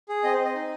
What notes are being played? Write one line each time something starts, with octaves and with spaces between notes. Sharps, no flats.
G#4
C4 D#5
C5
C4
D#5
D#4